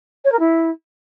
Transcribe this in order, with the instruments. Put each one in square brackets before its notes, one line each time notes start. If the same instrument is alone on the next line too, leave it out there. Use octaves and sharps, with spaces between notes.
[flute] C#5
A#4
E4